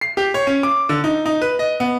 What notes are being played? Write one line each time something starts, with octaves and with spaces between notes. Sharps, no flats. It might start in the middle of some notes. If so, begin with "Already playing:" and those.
C7
G4
C#5
C#4
D6
D3
D#4
D#4
B4
D#5
B3